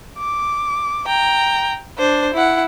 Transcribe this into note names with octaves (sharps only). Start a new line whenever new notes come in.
D6
G5 A#5
D4 C5
E4 F#5